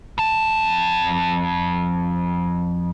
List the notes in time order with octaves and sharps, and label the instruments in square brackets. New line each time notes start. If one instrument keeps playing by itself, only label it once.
[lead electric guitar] F2 A5